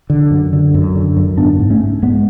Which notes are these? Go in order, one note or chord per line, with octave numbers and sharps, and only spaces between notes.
D3
F#2
D3
F#2
D3
F#2
G#2 B3 D4
G#2
A3 C#4
G#2
G#2 G#3 B3